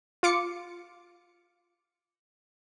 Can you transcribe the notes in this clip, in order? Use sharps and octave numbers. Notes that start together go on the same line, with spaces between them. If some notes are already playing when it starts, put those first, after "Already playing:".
F4 D6 C#7